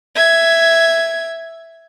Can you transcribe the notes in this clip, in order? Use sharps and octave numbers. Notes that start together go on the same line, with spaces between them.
E5 G#6